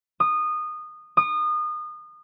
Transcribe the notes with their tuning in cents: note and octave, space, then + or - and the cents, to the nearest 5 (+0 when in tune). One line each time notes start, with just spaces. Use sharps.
D#6 -20
D#6 -30